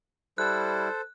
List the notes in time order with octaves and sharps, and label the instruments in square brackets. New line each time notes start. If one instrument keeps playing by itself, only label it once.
[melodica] G3 E4 [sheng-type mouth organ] A4 C5 [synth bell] F#6